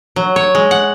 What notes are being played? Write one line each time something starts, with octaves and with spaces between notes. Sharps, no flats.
F#3
C#5
G#3
F#5